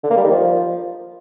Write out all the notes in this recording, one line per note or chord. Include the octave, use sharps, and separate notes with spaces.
D3
A#3
G3
D#3
F3